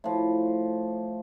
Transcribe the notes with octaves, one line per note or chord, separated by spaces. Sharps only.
A2 F3